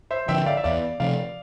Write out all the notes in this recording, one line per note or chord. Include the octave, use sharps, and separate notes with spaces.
C5 E5
D3 F3 E5 G5
D5 F5
E5
E2 D5 F5
C3 F3 D5 F5